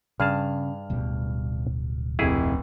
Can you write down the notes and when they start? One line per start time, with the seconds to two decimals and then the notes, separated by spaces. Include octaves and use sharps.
0.20 G2 C#3 G#4 A5 F6
0.90 D1 B2 G3
2.19 F1 C3 E4 G#4